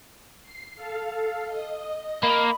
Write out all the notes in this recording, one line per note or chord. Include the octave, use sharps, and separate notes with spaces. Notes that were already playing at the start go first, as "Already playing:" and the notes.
C7
A4 F5
D#5
A#3 B5